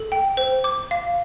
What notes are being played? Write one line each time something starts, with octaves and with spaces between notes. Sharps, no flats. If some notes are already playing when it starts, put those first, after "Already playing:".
Already playing: A4
G5
C5
D6
F5